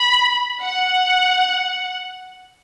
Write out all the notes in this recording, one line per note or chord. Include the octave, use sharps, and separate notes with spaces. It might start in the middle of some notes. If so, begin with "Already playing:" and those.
Already playing: B5
F#5